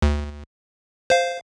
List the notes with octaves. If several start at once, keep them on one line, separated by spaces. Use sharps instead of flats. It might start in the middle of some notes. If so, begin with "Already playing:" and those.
D2
C5 F5